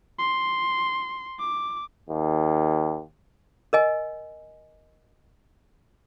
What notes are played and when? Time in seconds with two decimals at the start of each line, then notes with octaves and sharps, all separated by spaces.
0.19 C6
1.39 D6
2.09 D#2
3.73 A#4 D#5 G#5